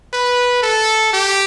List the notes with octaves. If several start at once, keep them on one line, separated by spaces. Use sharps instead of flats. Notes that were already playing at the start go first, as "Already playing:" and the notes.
B4
A4
G4